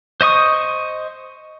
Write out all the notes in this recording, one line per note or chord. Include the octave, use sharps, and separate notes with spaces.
C5 D#5 C#6 D#6